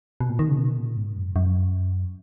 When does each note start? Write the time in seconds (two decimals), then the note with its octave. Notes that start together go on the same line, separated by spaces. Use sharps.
0.20 B2
0.30 A#2
0.39 D#3
0.49 C#3
0.58 B2
0.78 A#2
0.97 G#2
1.16 F#2
1.36 F#2